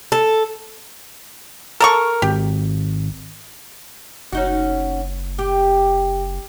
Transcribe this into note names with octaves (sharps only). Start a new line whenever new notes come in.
A4
A4 A#4 A#5 C#6
G#1 G4
F#1 C#4 D#4 F#4
G4